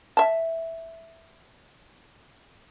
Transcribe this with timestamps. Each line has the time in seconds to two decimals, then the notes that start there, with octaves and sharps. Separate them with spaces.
0.17 E5 A5